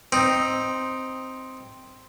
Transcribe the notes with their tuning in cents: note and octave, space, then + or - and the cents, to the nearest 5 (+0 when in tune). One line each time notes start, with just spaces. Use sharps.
C4 +0 D#4 +0